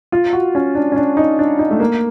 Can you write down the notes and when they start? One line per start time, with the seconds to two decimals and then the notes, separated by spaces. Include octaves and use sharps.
0.12 F4
0.33 F#4
0.55 C#4
0.75 D4
0.92 C#4
0.96 D4
1.17 D#4
1.39 D4
1.59 D#4
1.71 A3
1.80 A#3